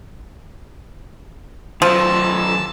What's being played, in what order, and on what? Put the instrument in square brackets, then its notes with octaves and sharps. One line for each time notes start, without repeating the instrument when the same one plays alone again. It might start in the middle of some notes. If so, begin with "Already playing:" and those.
[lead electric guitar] D#3 F#3 [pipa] F3 [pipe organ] A5 E6